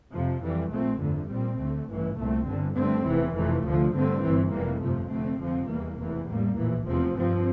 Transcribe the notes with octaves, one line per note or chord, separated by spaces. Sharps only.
F2 C3 F3
F2 E3 G3
A#1 A#2 A3 C4
G1 F2 D3 A3
A#1 A#2 G3 C4
D2 D3 A3
A1 G2 E3
C2 A#2 A3 C4
G1 G2 D3
G2 D3 A3 C4
F1 E2 E3
F1 F2 C3 E3 A3
D2 D3 F3
G2 D3 A3 C4
G1 G2 E3
F1 F2 E3 G3 A#3
G1 F2 C3 F3 A3
F1 F2 D3 A3 C4
F2 D3 F3 C4
E2 E3 G3 A#3
F1 E2 C3 E3
A1 A2 G3 A#3
A#1 A2 E3
F1 E2 C3 F3 C4
G2 F3 C4